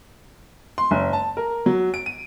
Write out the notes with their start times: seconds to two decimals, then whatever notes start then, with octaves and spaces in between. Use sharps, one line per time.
0.78 C6
0.91 F#1
1.13 A5
1.37 A#4
1.66 F#3
1.94 D7
2.06 D#7